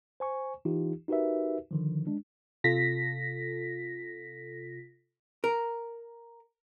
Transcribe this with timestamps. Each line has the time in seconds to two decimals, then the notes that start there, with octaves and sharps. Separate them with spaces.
0.20 C5 G#5 C#6
0.65 E3 D#4 F4 G4
1.08 D#4 F#4 G4 A#4 B4 E5
1.71 D3 D#3 F3
2.07 G#3 D4
2.64 C3 F4 A4 A#6 B6
5.44 A#4